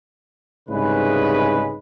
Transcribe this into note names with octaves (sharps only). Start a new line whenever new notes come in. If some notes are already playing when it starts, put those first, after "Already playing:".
C2 G#2 C#3 G#3 B4